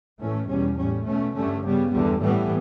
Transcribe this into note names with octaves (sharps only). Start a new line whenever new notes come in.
A2 E3 A3 C#4
E2 B2 G3 C#4
A2 G3 C#4
B2 A3 C#4
G2 D3 A3 C#4
C#3 G3 B3
E2 D3 G3
A2 E3 G3 B3